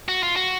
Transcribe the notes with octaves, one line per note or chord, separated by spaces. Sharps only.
F#4
F4
F#4